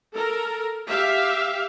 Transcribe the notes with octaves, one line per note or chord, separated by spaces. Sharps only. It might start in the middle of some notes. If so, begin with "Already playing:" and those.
A4 A#4
G4 E5 F5